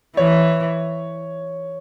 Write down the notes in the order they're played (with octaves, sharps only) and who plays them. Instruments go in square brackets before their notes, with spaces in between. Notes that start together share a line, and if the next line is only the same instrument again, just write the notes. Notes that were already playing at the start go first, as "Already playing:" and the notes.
[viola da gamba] E3 [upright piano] C#5